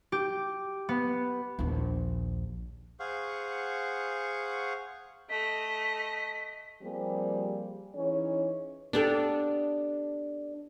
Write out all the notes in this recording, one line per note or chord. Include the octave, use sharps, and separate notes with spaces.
G4
B3
A#1 D#2
G#4 C5 F5 F#5 C#6
A3 D#5 B6
F3 G3 A#3 C4 G4 G#4
E3 C#4 D#4 G#4 C#5
B3 D4 G4 A4